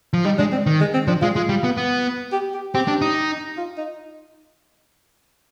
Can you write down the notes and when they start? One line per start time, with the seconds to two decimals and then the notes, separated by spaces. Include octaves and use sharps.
0.13 F3
0.25 G3 D#4
0.38 G#3 D4
0.52 C4
0.66 D#3
0.81 G#3
0.94 C4
1.07 F3 D4
1.22 G#3 F4
1.36 G#3 F4
1.49 G3
1.64 B3
1.77 B3
2.32 G4
2.54 G4
2.75 C4 G4
2.88 D4
3.01 D#4
3.58 F4
3.78 D#4